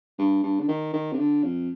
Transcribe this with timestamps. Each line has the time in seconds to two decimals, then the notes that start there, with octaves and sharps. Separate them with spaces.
0.19 G2
0.44 G2
0.60 D3
0.69 D#3
0.94 D#3
1.13 C3
1.19 D3
1.43 F2